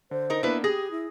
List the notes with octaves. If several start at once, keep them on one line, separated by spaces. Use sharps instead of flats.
D3 C5
D#4 A#4
A#3 B3 D4 E4 B4
G4 G#4 D#6 A#6
E4